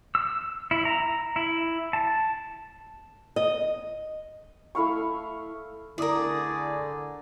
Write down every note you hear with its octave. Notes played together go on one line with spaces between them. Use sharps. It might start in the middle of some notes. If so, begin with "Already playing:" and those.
E6
E4
A#5
E4
A5
D#5
A3 E4 F5 C#6
D3 A3 E4 G#4 A#4 D5 D6 D#6